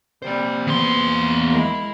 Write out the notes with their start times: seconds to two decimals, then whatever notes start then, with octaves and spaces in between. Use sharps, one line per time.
0.22 C3 G3 A#3 C5
0.67 E2 B3 C6
1.50 G#3 E4 A#4